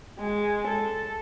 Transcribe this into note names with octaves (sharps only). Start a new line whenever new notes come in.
G#3
A4